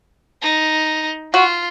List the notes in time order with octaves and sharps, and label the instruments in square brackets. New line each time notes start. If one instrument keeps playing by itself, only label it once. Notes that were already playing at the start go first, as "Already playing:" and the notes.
[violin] D#4
[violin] F4 [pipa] F#4